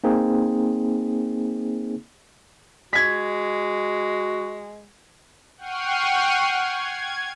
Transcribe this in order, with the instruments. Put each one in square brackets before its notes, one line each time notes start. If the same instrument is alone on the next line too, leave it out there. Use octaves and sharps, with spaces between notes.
[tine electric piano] A#3 C4 D#4 G#4
[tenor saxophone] G#3 [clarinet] F#4 [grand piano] G#6 B6
[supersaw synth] F#5 G5 C#6 F6 C7 D#7
G#6